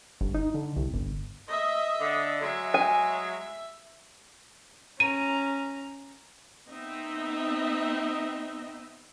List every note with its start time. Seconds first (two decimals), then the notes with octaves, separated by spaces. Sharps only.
0.21 G1
0.34 D#4
0.54 D3
0.77 C2
0.94 G1
1.48 D#5 E5
2.00 D3
2.41 F#3 G#3 E5
2.74 G#5
5.00 C#4 A#5 D#7
6.69 B3 C4 D#4 D#5 E5